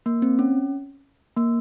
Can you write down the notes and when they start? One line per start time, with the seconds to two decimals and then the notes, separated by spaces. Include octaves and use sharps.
0.06 A#3
0.22 C4
0.39 C#4
1.37 A#3